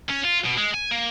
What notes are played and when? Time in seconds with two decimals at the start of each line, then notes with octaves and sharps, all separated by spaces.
0.10 C#4
0.25 F4
0.46 B2
0.58 G#3
0.74 G#5
0.91 A#3